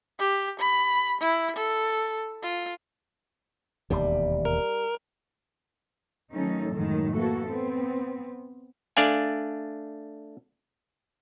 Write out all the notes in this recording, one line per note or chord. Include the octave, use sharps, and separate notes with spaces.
G4
B5
E4
A4
F4
E1 D#2 C3 G3
A#4
D#3 F#3 A3 C#4 D#4 A4
F#2 A2 D#3 F#3 G#3
E3 A#3 F#4 A4
B3 C4
A3 D4 D5 F5 G#5